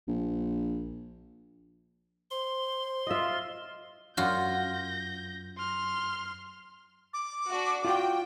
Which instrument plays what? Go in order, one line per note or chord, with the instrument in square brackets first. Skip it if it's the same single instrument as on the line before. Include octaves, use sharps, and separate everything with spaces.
[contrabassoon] A#1
[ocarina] C5 [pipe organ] C6
[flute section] F4 [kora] D#5 E5
[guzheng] F#2 F4 F#4 [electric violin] G6 A#6
[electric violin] C6 F6
[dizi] D6
[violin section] D4 F#4
[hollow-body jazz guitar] F4 F#4 [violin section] G5